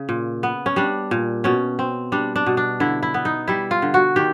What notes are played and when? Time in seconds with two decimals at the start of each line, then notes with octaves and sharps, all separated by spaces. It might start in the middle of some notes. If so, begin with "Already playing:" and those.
Already playing: C#3
0.09 A#2
0.43 B3
0.66 C#4
0.76 G3 D4
1.11 A#2
1.44 B2 C#4
1.79 C4
2.12 G3 D4
2.36 D4
2.46 B2
2.57 D4
2.80 D3 E4
3.03 E4
3.14 B3
3.25 D#4
3.48 G3 E4
3.71 F4
3.82 D3
3.94 F#4
4.16 D#3 G4